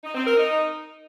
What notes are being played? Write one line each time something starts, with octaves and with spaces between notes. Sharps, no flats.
D#4
C4
A#4
D#4